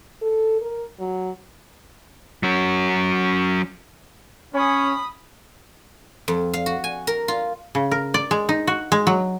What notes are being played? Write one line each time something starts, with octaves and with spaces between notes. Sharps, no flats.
A4
A#4
F#3
F#3 C#4
C#4 B5 D#6
F2
F5
F#4
G#5
A#4
F4
C#3
A#4
D5
G#3
D#4
F#4
G#3
F#3